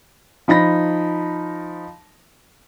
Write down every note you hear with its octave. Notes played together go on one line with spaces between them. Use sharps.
F3 D#4 B5 A#6